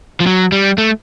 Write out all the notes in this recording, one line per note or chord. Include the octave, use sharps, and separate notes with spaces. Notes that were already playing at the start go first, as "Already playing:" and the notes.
F3
F#3
G3
A3